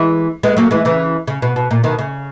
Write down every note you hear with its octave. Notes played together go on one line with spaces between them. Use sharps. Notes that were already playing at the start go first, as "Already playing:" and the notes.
Already playing: E3 G#3
G#3 B3
F#3 A#3
E3 G#3
C#3 E3
C#3
B2
B2
A#2
B2 D#3
C#3